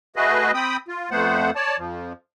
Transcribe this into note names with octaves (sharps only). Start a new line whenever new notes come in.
A3 F#4 G#4 B4 D#5
C4 G5 B5 D#6
F4
F2 A3 B3 C5 F#5
C#5 D5 A5
F2 F3